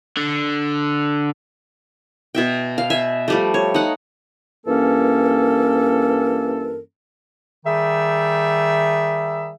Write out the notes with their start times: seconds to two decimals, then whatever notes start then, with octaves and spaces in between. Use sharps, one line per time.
0.17 D3
2.35 B2 E5 G5
2.78 F5
2.90 E5 G#5
3.28 F3 G3 A3
3.54 C#5
3.74 D#4 F#5
4.67 G2 E3 A#3 C#4 A4 A#4
7.66 D#3 G3 G#4 E5